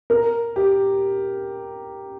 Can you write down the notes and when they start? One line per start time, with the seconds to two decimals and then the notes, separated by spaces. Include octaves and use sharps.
0.10 A#4
0.56 G4